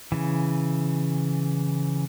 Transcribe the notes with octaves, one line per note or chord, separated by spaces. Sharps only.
C#3 E3